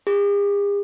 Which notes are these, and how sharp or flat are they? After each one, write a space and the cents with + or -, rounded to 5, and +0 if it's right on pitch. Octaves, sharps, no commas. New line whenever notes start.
G#4 -45